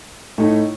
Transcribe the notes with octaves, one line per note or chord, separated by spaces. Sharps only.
A2 A3 D#4